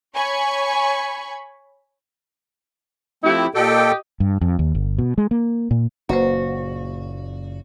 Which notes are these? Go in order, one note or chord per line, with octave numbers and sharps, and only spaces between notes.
C#5 G#5 B5 C#6
F3 A3 C4 E4 G4
A#2 G4 A4 D#5 G5
G2
F2
D#2
G1
B2
G#3
A#3
A#2
F#1 A#2 A#3 F#4 B4 C5